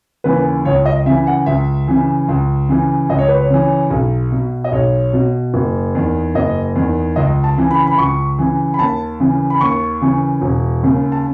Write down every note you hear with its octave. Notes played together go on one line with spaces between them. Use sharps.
D#2 C#3 E3 B4
C#2 C#5
D#5
C#3 E3 E5
F#5
C#2 E5
C#3 E3
C#2
C#3 E3
C#2 D#5
C#5
B4
C#5
C#3 E3
B1
B2
D#5
B1 C#5
B2
F#1
E2 D#3
F#1 D#5
E2 D#3
C#2 D#5
A5
C#3 E3
B5
B5
C#2 C#6
C#3 E3
B5
D#2 A5
C#3 E3
B5
D#2 C#6
C#3 E3
E1
D#2 C#3
A5